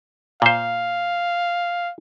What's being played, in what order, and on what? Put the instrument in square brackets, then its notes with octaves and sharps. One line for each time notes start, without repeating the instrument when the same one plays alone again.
[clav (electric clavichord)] A#2 C5 [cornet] F5